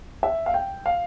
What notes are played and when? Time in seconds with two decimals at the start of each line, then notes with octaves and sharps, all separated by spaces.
0.23 E5
0.46 F5
0.54 G5
0.86 F5